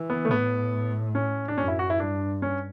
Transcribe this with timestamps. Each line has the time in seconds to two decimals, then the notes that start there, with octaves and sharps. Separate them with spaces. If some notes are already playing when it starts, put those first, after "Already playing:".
Already playing: E3
0.10 B3
0.25 A3
0.31 A2 B3
1.15 C#4
1.48 D4
1.58 F#2 C#4
1.68 E4
1.79 F#4
1.90 E4
2.00 G2 D4
2.42 C#4